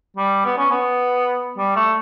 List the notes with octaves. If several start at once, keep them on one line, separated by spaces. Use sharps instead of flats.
G3
B3
C#4
B3
G3
A3